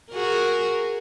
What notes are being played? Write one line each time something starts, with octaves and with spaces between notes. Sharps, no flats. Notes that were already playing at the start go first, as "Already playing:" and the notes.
F#4 G#4 A#4